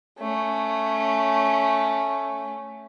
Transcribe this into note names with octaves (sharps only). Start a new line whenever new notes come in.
A3 C#4